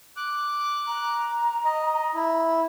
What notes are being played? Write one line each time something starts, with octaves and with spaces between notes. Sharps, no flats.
D6 F#6
A#5
D#5
E4